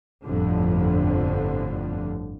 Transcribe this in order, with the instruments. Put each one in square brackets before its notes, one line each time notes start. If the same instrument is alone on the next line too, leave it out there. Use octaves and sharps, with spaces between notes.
[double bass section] G1 F2 A2 D3 F3